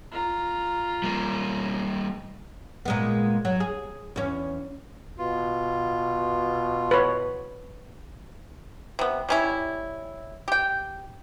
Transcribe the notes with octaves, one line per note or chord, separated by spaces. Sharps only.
F4 A#5
G3 A#3
A#2 G#3 B3
F#3
G#4
E2 C#4
B2 F4
B4 C#5
C3 B3
G3 C#4 E4
G4 G5